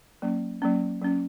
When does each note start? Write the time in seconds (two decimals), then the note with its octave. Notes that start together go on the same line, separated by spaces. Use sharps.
0.22 F#3 A#3 C#4
0.62 F#3 A#3 C#4
1.01 F#3 A#3 C#4